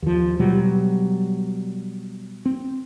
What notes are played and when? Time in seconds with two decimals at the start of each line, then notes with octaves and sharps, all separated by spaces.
0.02 D#2 F3
0.39 B2 F#3 G3
2.45 C4